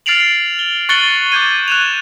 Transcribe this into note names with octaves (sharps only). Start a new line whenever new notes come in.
F6 A6 C7 D7 F7 F#7
G7
C#6 F#6 A6 C#7 F#7 G7
D6 F6 G6 G#6 D#7
F#6 E7 F7